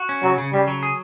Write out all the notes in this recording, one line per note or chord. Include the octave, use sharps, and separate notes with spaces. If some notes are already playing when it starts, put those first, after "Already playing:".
Already playing: F#4
C#4
C#3 F#3
C#3
C#3 G3
F#3
G#4